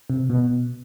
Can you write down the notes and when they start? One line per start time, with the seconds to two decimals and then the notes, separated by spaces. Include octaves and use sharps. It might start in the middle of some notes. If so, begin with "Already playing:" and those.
0.10 C3
0.30 B2